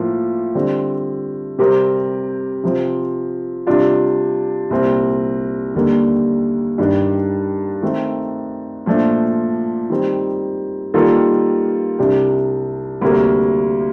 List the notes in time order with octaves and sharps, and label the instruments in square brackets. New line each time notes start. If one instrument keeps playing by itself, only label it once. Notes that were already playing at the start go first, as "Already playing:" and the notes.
Already playing: [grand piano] A2 F3 A#3 F4
D3 G3 C4
C3 G3 C4 G4 A#4
C3 F3 C4
C3 G3 D4 F4
C2 A#2 G3 C4
D#2 D3 G3 A#3
G2 D#3 G3 D4
D#3 A3 C4
A#2 F3 A3 D4
D#3 G3 C4
D#3 G3 A#3 F4 A4
C2 C3 G3 D4 G4
D2 C3 G3 A#3